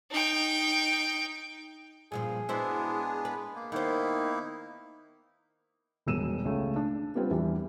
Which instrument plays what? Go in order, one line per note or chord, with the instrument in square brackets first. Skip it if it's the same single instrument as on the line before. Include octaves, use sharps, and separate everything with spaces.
[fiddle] D#4 G5
[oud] G2 A#2 F3 [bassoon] G#4
[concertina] G#3 B3 D4 [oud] E4 F#4 C5
[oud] B4
[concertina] A#3
[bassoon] D#3 [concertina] A#3 D#4 E4 [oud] B3 C5
[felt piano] E1 G2 B2 E6 D#7 E7
C#2 C#3 A3
D4
G3 B3 C4 F4 B4
E2 E3 G3